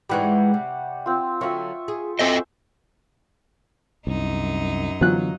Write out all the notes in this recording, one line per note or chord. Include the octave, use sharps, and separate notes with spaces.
G#2 E3 G3 G#3 F#5 C#6
C3
C4 F4
D3 F#3 F4 E5 C#6
G#4
C4 F#4 A4 C5 D#5 E5 G#5
C2 F#2 D#4
D3 E3 F#3 B3 F4 F#6